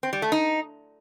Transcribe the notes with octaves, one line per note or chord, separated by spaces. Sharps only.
C4
G3
A3
D#4